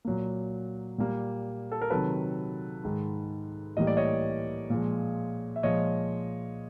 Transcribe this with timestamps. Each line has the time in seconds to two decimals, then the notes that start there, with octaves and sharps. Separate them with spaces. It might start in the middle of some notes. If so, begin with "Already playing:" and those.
0.05 A#2 F#3 A#3
0.98 A#2 G3 A#3
1.72 A4
1.82 A#4
1.90 C3 D#3 F#3 A4 B4
2.84 G#2 D#3 G#3
3.77 A2 E3 G3 A#3 D#5
3.87 D5
3.97 C#5 D#5
4.70 A#2 F3 G#3
5.56 E5
5.63 A#2 F3 G#3 C#5 D#5